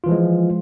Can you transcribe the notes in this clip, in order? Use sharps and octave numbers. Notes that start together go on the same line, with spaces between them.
E3 F3 G#3 F4